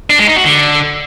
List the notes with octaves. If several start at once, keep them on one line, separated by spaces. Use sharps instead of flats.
D4
G#3
D#4
F#4
D3